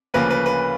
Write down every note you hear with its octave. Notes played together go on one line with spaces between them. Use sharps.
D2 C#3 F3 A#3 B4
B4
B4